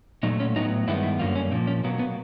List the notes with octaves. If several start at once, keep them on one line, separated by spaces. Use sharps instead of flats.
A#2 F#3 A3 D#4
C#4
A2 F#3 B3 D#4
G2 D#3 G#3 B3 E4
E4
F#2 D3 G3 A#3 F4
C#4
A#2 F3 A#3 C4
C#4
B2 F#3 A#3 B3
B3